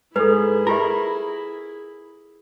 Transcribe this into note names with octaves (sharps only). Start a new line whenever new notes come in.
G#2 E4 G#4 A4 B4
F4 G4 A#4 E5